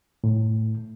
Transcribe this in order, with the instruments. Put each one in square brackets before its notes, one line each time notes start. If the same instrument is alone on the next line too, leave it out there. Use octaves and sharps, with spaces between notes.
[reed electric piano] A2